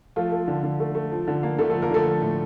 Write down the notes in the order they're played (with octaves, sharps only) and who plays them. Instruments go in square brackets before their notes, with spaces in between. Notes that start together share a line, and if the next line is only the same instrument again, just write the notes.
[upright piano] F3 A3 F4
A3
D3
D3
A3
A3
F3
D3
A#3
D3 A3 A4
A3 A4
F3
A#3 A#4
D3 A3 A4
F3
A2